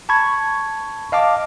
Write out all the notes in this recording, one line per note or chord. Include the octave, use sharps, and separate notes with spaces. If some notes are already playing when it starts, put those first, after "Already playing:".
A5 B5 C#6 G#6
D#5 F5 A5 D6